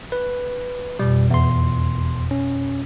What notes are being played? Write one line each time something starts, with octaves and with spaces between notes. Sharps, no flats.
B4
F2 B2 G3
E2 C6
C#4